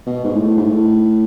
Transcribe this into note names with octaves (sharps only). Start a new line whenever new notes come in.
B2
G#2
A2
G#2
A2